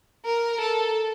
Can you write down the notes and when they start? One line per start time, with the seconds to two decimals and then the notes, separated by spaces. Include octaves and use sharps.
0.25 A#4
0.60 A4